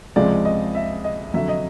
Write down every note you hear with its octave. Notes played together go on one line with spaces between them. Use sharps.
C#2 C3 F3 G#3 D5
D#5
E5
D#5
F2 D3 F#3 E5
D#5